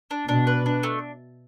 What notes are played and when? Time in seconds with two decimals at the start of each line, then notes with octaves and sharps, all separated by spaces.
0.11 D4
0.29 B2 D4
0.47 B4
0.66 D4
0.83 A3